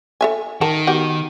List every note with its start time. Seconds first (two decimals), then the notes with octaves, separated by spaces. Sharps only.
0.21 A4 E5 G#5
0.61 D#3 A#4 G5 A5
0.87 B3 F#4 G4